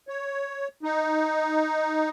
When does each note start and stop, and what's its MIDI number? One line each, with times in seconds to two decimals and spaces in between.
0.08 0.68 73
0.83 2.09 63